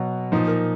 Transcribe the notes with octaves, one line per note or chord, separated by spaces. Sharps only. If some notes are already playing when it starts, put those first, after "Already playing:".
Already playing: B2 F#3
A#2 F3 D#4
A#4